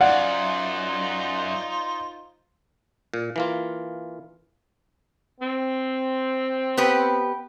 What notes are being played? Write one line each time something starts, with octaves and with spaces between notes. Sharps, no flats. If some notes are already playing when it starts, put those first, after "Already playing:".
F#2 D#4 F4 C5 D5 F5 F#5
A#2
E3 A#3 F4
C4
B3 G4 B4